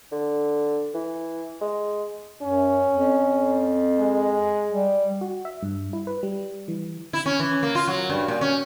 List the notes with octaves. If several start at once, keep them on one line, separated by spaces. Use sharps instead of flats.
D3
E3
G#3
F#2 C#4
F2
G#3
G3
F#4
E5
G2
E4
B4
G3
E3
E4
C#4
E3
A#3
F4
F#3
G2
A#2
C#4